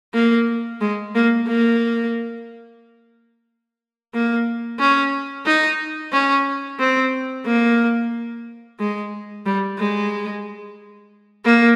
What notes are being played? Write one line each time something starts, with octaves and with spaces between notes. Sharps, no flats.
A#3
G#3
A#3
A#3
A#3
C#4
D#4
C#4
C4
A#3
G#3
G3
G#3
A#3